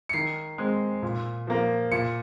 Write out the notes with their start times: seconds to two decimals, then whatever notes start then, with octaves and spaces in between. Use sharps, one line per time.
0.09 C#7
0.13 D#3 C7
0.58 G#3 C4
1.03 A#2
1.47 F3 A#3
1.92 A#2 C#7